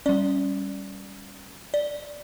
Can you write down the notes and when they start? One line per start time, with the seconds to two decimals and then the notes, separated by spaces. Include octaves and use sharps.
0.06 G3 C#4 D5
1.74 D5